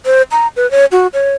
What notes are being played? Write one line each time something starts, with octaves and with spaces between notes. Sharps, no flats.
C5
A#5
B4
C#5
F#4
C#5